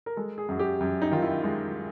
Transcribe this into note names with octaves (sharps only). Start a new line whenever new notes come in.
A#4
G#3 A4
G#4
F#2 F#4
G4
F#2
D#4
D#3 F4
E4
G#3 F4